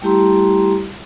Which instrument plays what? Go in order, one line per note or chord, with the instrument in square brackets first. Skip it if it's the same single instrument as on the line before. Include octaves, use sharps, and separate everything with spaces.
[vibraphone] G3 A3 E4 G4 A#5 C6